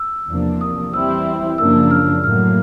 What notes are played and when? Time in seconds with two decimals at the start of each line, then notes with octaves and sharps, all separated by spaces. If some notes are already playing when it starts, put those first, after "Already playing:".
Already playing: E6
0.29 E2 C3 F3 A#3 D4
0.61 D#6
0.93 E3 G3 C4 E4 G4 E6
1.58 F#2 C#3 F3 A#3 D4 E6
1.91 F6
2.23 A2 F#3 A#3 F6